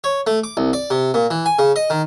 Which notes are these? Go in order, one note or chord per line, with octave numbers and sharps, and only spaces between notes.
C#5
A3
D6
C2
D5
C3
A#2
E3
G#5
C#3
D#5
D#3